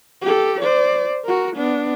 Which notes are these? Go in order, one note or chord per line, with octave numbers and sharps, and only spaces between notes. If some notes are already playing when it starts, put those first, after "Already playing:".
G4 A4
C5 D5
F#4 A#4
B3 D4